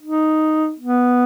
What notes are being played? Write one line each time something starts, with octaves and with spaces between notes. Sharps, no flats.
D#4
B3